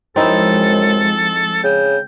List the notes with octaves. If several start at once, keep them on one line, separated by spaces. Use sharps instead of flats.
F#2 F3 G#3 C4 D#4 E4 A4
C#3 G5